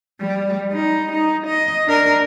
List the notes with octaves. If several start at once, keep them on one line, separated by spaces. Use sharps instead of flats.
G3
D#4
D#4
D#5
D4 A#4